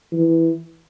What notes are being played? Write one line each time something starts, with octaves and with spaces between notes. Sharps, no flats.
E3